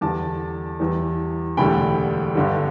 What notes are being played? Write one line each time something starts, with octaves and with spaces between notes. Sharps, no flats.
E2 D3 G3 A5 D6
E2 E3 G3
E1 D2 D3 G3 G5 B5
G1 G2 D3 G3